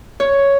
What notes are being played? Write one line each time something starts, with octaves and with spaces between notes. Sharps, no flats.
C#5